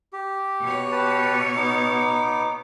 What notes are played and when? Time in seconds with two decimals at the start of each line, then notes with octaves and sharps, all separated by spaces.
0.13 G4
0.61 B2 C#5
0.92 G4 B4 A5
1.57 B3 D#4 D6